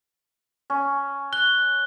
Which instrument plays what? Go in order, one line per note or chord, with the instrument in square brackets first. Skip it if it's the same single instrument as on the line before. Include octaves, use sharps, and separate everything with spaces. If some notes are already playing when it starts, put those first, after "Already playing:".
[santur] C#4
[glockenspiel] F#6 G7